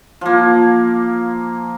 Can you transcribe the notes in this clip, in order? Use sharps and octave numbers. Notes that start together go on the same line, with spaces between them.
F3 A#3